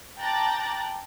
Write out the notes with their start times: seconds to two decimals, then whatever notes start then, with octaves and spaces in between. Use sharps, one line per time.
0.19 G5 A5 A#5 D6 F#6 A6